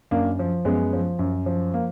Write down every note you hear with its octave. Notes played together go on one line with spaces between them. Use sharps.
F#2 A#3 D4
F3
F#2 G#3 B3
F3
F#2
F3
A#3